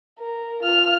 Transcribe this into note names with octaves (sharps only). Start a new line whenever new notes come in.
A#4
F4 F6